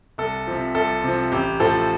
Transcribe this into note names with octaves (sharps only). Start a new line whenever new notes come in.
C2 A4
C3 F3
C2 A4
C3 F3
A1 G4
A2 F3 A4